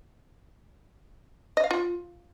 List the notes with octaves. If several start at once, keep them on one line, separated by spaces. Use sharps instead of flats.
D#5
F5
F4